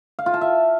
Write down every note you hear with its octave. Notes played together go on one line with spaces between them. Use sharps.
F5
F4
A5
E5